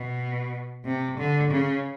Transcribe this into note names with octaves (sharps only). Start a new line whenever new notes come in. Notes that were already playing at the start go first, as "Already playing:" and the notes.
Already playing: B2
C3
D3
C#3